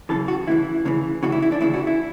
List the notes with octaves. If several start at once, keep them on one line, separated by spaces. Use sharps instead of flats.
F#2 C#3 E3 A4
F#4
D2 C#3 E3 E4
D2 C#3 E3
D2 C#3 E3 F#4
E4
E4
D4
D2 C#3 E3 E4
F#4
E4